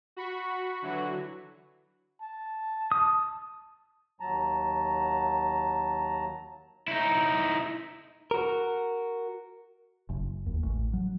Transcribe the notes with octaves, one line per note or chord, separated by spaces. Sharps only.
F#4 B5 C#6
D3 E3 F#3 F#4
A5
D#6
D#2 F#3 A5 A#5
D#4 E4
F#4 A#4
F#1
D#2
A1
F#3